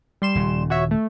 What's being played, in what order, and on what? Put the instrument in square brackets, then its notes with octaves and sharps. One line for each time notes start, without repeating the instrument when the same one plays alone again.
[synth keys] G3 C6 E7
[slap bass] D#1 C#3
[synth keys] F#4 C#5 E5
A3